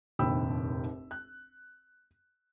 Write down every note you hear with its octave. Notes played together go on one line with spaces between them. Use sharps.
F1 A#1 D#2 G5 B5 E6
F#6